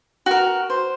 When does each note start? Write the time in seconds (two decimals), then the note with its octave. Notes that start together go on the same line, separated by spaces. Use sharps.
0.26 F#4 A#4
0.70 C5